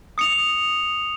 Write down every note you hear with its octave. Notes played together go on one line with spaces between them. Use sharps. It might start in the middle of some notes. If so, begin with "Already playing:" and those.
D#6 C#7 F7